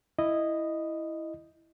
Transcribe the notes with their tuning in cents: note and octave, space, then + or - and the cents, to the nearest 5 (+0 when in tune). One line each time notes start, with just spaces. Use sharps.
E4 +0 D#5 -10